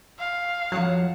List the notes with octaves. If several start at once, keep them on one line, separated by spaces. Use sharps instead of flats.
F5
F2 F#3 F#5 A5